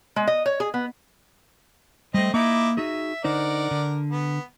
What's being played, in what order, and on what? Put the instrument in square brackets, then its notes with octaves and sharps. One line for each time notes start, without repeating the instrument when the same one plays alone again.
[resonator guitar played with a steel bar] G#3
D#5
C#5
G#4
B3
[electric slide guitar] G3 A3 [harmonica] C4 D#5
[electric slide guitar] A#3 [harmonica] D#4 E4 D6
[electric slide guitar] D#4 F#4 G#4 [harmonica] E5
[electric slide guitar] D3 D#4 C5 [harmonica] A#4 D5 F#5
[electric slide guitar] D3
[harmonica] B3